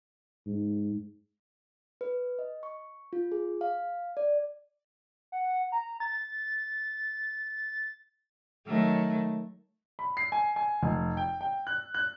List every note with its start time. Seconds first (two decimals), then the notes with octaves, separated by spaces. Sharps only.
0.46 G#2
2.01 B4
2.39 D#5
2.63 C#6
3.13 F4
3.32 G#4
3.61 F5
4.17 D5
5.32 F#5
5.72 A#5
6.00 A6
8.67 D#3 F#3 A3
9.99 B5
10.17 C7
10.32 G#5
10.56 G#5
10.83 F1
11.17 G5
11.41 G5
11.67 F#6
11.94 F#6